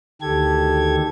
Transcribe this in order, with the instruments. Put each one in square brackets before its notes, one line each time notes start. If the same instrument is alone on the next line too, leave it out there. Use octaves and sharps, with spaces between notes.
[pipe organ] D2 D#3 G4 A4 G#6